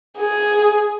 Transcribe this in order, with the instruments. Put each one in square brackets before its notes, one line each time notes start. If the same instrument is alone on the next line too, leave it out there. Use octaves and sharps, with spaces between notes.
[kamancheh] G#4